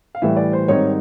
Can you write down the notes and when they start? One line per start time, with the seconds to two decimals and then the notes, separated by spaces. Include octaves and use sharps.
0.15 F5
0.22 A2 E3 G3 E5
0.36 D5
0.53 C5
0.68 G#2 D#3 G3 C4 D#4 C#5